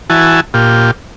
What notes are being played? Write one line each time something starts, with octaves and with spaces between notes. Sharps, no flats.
E3 E4 F#4 G#5 A5
A#2 F4 G4